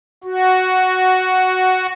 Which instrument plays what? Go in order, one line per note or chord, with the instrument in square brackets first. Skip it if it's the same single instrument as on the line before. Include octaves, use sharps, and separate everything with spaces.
[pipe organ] F#4